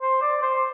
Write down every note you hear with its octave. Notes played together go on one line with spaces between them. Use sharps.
C5
D5
C5